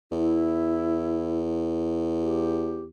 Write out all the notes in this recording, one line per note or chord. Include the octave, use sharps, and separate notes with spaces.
E2 E4
G4